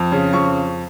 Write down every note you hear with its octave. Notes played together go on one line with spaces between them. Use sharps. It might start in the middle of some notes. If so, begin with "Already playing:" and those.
Already playing: F2
C#3
F2 C#6